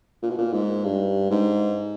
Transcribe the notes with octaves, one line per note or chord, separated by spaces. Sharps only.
A#2
B2
A#2
G#2
G2
G#2